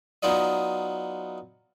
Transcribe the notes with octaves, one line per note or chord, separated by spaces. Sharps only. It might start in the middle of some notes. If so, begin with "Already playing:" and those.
F#3 B3 D#4 F4 D5 D#5